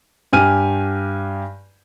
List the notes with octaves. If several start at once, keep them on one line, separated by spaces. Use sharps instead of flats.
G2 G4 G#5 F6 D#7